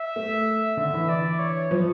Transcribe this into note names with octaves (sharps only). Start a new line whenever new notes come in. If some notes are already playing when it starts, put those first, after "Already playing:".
Already playing: E5
A3
D3 E5
E3
D5
C#5
F3